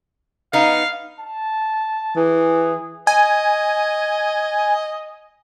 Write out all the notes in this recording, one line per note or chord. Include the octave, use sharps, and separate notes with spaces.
B3 D#4 F5
A5
E3 G#4
D#5 G#5